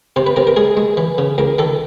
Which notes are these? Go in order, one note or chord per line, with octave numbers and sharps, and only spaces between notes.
C3 C5
B4
C3 A#4
A#4
G#3 G#4
G#3
E3
C#3
C#2 A#4
D#3 A4